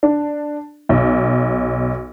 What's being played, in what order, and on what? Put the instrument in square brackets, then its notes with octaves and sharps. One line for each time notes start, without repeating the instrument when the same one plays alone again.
[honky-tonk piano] D4
B1